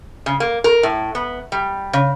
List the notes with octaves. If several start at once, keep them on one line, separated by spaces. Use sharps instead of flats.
C#3
A#3
A#4
A2
B3
G3
C#3